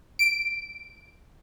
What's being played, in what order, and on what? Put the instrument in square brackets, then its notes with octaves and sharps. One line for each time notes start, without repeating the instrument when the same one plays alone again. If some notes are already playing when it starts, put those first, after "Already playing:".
[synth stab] D7